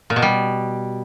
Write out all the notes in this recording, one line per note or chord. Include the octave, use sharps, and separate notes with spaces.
A#2
B2
G3